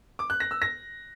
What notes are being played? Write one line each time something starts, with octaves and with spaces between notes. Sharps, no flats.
D6
F#6
A#6
E6
A#6